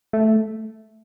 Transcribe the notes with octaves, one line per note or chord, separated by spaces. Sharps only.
A3